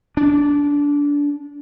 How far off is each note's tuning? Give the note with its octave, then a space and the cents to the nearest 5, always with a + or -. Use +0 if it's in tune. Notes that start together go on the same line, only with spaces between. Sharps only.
D4 -20